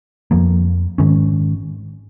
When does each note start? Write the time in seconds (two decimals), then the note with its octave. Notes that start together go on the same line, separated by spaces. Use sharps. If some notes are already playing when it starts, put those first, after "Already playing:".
0.31 F2 F3 A#3
0.98 G#2 D#3 G#3 C#4